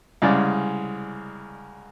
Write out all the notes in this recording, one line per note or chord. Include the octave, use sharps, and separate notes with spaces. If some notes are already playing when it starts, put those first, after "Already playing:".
C2 C#3 G#3 D5